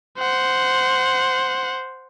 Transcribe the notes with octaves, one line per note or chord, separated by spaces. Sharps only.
C5 F#5